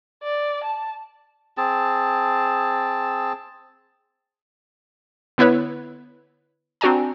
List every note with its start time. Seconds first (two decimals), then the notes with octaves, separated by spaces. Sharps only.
0.23 D5
0.64 A5
1.57 C4 G#4 A5
5.38 D3 B3 E4 B4 C#5
6.81 C4 D4 F#4 D5 G#5 A#5